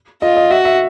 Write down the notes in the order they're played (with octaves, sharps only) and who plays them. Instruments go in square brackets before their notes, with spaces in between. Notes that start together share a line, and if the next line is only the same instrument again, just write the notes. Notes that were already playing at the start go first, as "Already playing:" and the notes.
[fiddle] F4 [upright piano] D#5
[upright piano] D#5
[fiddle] F#4 [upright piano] E5
[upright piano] E5